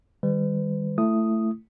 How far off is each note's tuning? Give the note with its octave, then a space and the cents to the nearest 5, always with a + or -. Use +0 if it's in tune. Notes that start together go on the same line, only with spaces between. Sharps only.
D#3 +0 G3 +30 B4 +40
A3 +5 E4 +25 D#6 +0